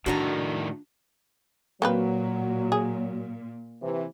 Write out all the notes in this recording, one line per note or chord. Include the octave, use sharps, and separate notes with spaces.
A2 D#3 D4 F#4 D5 A#5
A#2 F#3 A#3 C4 B4
G#4
C3 E3